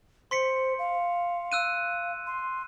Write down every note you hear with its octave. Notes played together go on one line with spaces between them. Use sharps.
C5 C6 B6 C#7
F5
E6 F#6 D#7
C6